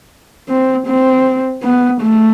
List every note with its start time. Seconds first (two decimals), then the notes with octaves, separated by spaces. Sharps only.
0.48 C4
0.87 C4
1.63 B3
2.01 A3